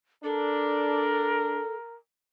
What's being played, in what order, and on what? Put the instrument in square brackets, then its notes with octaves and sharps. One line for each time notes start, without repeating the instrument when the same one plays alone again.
[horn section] D4 [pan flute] A4 [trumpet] A#4